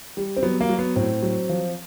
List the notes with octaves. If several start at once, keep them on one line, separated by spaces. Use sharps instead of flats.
G3
C4
F#3 B3
A#3
F#3
B3
A2 C4
F#3
F3